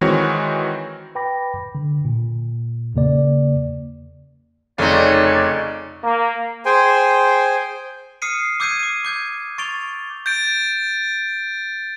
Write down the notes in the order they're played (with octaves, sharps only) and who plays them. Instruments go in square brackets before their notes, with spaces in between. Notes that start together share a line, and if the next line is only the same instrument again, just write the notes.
[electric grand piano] D#3 E3 G#3 C4 F#4 C#5
[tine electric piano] B4 G5 B5 D6 A#6
D3
A#2
E2 C#3 A#3 D5
[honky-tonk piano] F1 [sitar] C#3 D#4 [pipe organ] C#5 D5
[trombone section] A#3
[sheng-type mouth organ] G#4 C5 G5 G#5 C6
[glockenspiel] D#6 F6 C7 C#7 D#7
D6 E6 G6 G#6 C7 D#7
D6 D#7
D6 G6 G#6
C#6 A6 D7 F7 G7
[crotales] G6 A6 D7